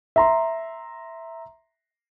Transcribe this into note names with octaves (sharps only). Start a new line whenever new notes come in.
E5 A#5 C6